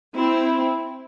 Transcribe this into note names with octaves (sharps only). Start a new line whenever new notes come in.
C4 E4